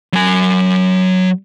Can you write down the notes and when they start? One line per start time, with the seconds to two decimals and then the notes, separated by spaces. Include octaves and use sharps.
0.13 F#3 G#5